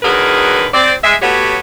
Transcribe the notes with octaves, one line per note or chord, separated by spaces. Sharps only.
D3 D#3 F#3 G#4 A#4 B4
C4 D5
G#3 E5
A3 B3 F#4 G4 C#5